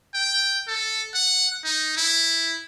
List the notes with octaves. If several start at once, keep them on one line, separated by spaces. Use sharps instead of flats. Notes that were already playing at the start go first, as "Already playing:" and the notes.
G5
A4
F#5
D#4
E4